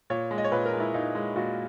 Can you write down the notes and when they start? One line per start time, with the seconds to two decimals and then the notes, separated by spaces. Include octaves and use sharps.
0.10 A#2 C#5
0.31 G#3
0.38 D#5
0.44 C#5
0.51 A#2 B4
0.66 A#4
0.73 G#3
0.80 E4
0.94 A#2 D#4
1.15 G#3
1.36 A#2 F#4